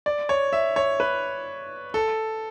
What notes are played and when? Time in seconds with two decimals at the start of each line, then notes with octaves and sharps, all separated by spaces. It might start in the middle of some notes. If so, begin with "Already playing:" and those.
0.06 D5
0.29 C#5
0.53 E5
0.76 C#5
1.00 B4
1.94 A4